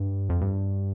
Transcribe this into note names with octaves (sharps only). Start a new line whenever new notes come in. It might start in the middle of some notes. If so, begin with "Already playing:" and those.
Already playing: G2
F2
G2